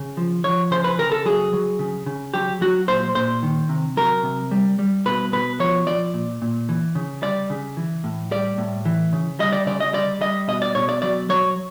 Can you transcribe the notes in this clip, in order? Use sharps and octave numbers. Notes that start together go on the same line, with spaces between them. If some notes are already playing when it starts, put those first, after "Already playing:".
Already playing: C#3
F3
F3 C#5
C#3 C5
B4
C#3 A#4
A4
F#3 G#4
F#3
C#3
C#3
F#3 G4
F#3 F#4
A#2 C5
A#2 C5
D#3
C3
F#3 A#4
C3
G3
G3
B2 B4
B2 B4
F3 C#5
F3 D5
A#2
A#2
E3
C#3
G3 D5
C#3
E3
A2
G3 D5
A2
E3
C#3
G3 D#5
D5
C#3 D5
D#5
G3 D5
G3 D#5
B2 D#5
D5
B2 C#5
D5
F#3 D5
F#3 C#5